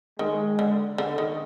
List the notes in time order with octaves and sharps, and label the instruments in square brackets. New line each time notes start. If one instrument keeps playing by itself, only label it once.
[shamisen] D#3 [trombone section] G#3
[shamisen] D3
D3
D#3